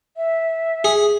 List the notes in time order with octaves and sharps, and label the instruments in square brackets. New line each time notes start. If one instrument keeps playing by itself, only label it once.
[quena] E5
[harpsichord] G#4